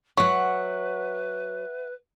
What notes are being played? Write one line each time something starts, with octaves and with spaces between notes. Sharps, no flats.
F#3 B4 E5 F#5 C#6